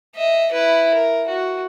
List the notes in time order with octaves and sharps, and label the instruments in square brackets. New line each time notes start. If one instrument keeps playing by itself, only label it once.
[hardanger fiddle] D#5 E5
E4 B4
A#4
F#4